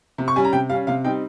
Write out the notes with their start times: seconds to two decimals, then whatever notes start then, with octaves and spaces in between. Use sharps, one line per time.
0.18 C3
0.28 C#6
0.36 G3 C#4 G#5
0.44 A#5
0.53 C3 G5
0.70 G3 C#4 F5
0.87 C3 F5
1.05 G3 C4 D#4 G5